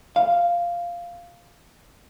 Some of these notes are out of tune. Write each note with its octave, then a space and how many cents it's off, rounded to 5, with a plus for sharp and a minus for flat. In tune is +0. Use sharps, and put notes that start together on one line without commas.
F5 -5